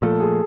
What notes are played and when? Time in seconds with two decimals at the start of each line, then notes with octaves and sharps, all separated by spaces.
0.02 A#2 F3 A3 A4
0.20 G#4